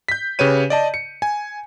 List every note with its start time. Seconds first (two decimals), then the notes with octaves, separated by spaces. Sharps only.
0.09 G6 B6
0.39 C#3 G4 B4 C#5 D#7
0.70 D5 D#5 A5
0.94 C#7
1.22 G#5